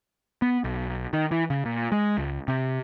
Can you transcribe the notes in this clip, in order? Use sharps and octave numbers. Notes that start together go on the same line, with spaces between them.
B3
B1
D#3
E3
C#3
A#2
G#3
C#2
C3